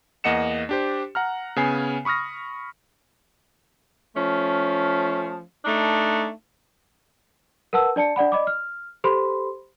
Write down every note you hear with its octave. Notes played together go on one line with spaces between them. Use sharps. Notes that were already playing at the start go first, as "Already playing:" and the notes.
E2 A#3 D#5 F#5 C#7 E7
D4 G4 C5
F#5 A#5 F6
C#3 B3 G#5 C7
B5 C#6 D#6 F6 A#6
F3 A3 C#4
A3 D4 D#4
A#4 B4 F#5 A5 E6
D4 D5 A5 C#7
D4 D5 F#5 B5
D5 D#5 B5 D6
F6
G4 A4 C5 B5 C6